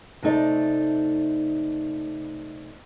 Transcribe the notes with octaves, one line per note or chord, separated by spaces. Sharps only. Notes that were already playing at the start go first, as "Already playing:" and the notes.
C3 A3 D#4 D5